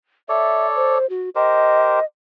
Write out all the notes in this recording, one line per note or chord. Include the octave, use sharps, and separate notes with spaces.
A4 C#5 D5 E5
C5
F#4
G4 A#4 C5 D#5